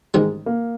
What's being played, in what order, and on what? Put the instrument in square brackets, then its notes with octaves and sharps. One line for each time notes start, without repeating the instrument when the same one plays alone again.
[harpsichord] A1 G#2 D#3 G3 [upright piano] G#3
[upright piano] A#3